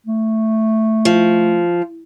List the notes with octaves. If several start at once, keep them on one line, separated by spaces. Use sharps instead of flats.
A3
F3